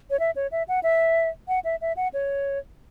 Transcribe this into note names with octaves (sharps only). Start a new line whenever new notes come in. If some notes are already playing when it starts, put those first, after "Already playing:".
C#5
E5
C#5
E5
F#5
E5
F#5
E5
E5
F#5
C#5